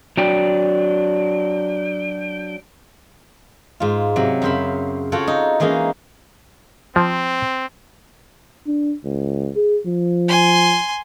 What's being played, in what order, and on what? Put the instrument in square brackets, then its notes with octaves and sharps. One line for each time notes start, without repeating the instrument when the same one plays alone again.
[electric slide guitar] F#3 D4 G5
[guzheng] G#2 F4
C3 F#3
F#2 C#3 C5 E5 B5
F4 F#4 A4 C#5 F#5 G5
D#4
E3 G#3 A#3 C#4 D#4
[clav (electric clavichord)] F3 [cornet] C4
[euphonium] D4
C#2
G#4
F3
[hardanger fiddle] G#5 C6